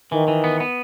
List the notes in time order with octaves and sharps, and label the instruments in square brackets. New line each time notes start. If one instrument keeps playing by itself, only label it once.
[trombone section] D#3 [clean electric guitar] E3
[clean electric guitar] E3
B3
B3